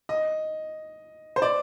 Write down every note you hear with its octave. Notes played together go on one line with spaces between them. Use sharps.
D#5
C5
D5